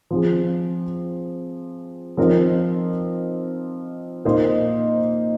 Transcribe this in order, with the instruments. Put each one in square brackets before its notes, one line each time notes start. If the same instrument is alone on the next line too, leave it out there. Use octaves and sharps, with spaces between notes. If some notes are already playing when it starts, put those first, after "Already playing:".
[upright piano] F3 C4 G#4
F3 C4 D#4 A#4
A#2 A#3 D#4 C5 D#5